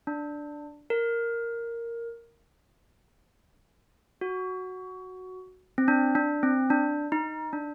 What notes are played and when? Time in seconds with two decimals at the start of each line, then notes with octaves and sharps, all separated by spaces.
0.07 D4
0.90 A#4
4.21 F#4
5.78 C4
5.88 D4
6.15 D4
6.43 C4
6.70 D4
7.12 D#4
7.53 D4